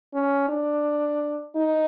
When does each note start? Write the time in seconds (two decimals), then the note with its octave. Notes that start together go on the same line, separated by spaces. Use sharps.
0.14 C#4
0.48 D4
1.56 D#4